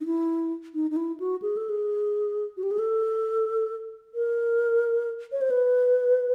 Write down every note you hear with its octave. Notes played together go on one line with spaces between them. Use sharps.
D#4
E4
D#4
D#4
E4
F#4
G#4
A4
G#4
F#4
G4
G#4
A4
A#4
C#5
C5
B4